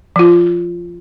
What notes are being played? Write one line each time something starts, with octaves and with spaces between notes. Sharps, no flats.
F3 F4